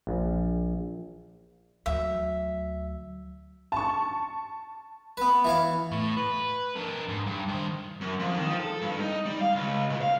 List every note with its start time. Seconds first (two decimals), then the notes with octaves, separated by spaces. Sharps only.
0.07 A#1
1.86 D2 F#3 E5
3.72 A5 C#6
5.17 B3 B4
5.45 E3 C#5 F5
5.92 A2
6.17 B4
6.76 D4 A#4
7.09 G#2
7.26 G2
7.48 D#3 C5
8.01 F#2
8.19 F2
8.34 D#3
8.48 F3
8.60 A4
8.81 G2
9.00 D#4
9.26 G3
9.41 F5
9.55 C#2
9.90 A#2
10.01 F5